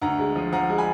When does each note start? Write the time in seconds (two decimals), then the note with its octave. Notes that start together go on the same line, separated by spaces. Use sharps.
0.02 D2 F#5 A#5
0.19 G#3
0.36 F3
0.52 F3 F#5 A#5
0.70 G#3
0.78 G#5 B5